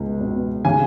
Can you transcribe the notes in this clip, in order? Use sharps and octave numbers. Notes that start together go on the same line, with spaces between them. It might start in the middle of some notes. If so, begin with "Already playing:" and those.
Already playing: C#2 B2
B2
C#3 G#5